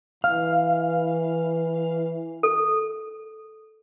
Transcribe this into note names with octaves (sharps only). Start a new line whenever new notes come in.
E3 F5
A4